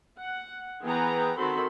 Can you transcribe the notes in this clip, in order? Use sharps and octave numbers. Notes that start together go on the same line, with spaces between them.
F#5
E3 B3 G#4 B4 G5 A#5
D#3 C4 F#4 A4 B5 C6